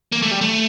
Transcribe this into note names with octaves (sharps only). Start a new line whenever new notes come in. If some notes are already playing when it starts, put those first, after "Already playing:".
A#3
A3
G3
A3